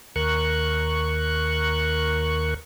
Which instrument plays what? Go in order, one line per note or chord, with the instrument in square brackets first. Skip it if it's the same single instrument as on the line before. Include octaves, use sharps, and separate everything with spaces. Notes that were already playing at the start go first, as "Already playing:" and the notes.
[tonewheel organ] D#2 A#4 C#6 F#6